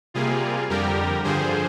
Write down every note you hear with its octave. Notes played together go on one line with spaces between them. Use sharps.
C3 G3 A#3 F4 G#4
F2 D3 G3 G4 A#4
G2 D3 F3 G#4 C5